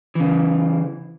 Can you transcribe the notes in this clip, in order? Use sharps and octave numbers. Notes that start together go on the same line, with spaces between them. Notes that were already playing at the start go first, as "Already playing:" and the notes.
C#3 E3